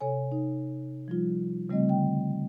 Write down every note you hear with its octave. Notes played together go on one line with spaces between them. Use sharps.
C3 A4 C#5 G#5
D#4
F3 G3 F4
C#3 G3 A3 C4 D#5
D3 G5